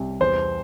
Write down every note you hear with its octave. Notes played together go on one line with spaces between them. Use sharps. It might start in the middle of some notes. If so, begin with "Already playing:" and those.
Already playing: C2
E2 C5